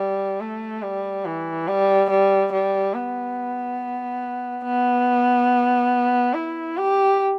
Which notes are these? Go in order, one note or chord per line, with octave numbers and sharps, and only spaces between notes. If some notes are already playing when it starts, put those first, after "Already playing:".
Already playing: G3
A3
G3
E3
G3
G3
G3
B3
B3
E4
G4